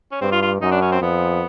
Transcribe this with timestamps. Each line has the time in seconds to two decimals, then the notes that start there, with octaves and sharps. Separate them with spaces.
0.12 C#4
0.21 G2 C4
0.32 F4
0.42 F4
0.61 F#2 D#4
0.71 D4
0.81 C#4
0.92 C4
1.01 F2 B3